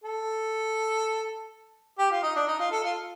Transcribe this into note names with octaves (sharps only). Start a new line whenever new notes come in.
A4
G4
F4
D#4
D4
D#4
F4
A4
F4